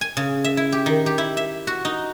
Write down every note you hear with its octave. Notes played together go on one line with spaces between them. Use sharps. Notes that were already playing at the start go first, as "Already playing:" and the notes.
G#5
C#3
E5
E4
G4
D#3
G4
E4
E5
F#4
D#4